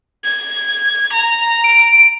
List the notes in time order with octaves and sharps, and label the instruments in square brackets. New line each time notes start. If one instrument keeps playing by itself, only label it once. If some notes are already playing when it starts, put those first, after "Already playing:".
[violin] G#6
A#5
[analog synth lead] D7